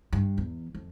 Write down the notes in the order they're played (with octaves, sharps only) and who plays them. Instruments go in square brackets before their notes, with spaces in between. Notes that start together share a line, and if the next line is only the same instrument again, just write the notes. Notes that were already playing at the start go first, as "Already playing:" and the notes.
[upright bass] G2
E2
F2